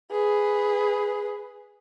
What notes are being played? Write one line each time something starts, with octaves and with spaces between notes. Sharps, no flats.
G#4 B4